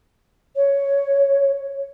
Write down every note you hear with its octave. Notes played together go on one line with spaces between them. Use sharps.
C#5